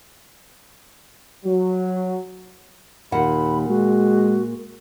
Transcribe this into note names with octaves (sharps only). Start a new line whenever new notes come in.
F#3
D#2 A#2 F#5 B5
G#3 F#4